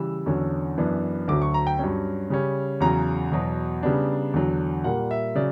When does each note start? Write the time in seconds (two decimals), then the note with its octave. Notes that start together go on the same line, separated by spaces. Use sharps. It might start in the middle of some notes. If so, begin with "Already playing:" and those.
Already playing: C#3 E3 G3 E6
0.26 E2 D3 F#3 C#4
0.78 F#2 E3 B3 D4
1.28 D2 D3 F#3 D6
1.42 C#6
1.54 A#5
1.67 G5
1.79 G2 F#3 C#4
2.30 C#3 G3 C#4
2.80 E2 C#3 F#3 A#5
3.32 E2 B2 F#3
3.83 C#3 G3 B3 D4
4.34 E2 D3 F#3
4.84 A#2 G3 A#3 F#5
5.11 E5
5.35 C#3 F#3 D5